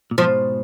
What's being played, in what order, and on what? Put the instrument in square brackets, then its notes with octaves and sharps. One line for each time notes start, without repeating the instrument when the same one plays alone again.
[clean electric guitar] A#2
[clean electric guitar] G#2 B2 [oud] F3